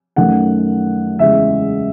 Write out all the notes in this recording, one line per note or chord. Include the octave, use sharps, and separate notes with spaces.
F#2 D#3 A3 F#5
E2 C#3 G#3 E5